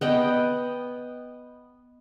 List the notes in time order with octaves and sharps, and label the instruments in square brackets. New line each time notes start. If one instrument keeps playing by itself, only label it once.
[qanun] B3 D#5 G5